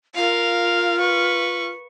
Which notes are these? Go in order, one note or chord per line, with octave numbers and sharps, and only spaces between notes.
F4 A#4 F5
B4 C#6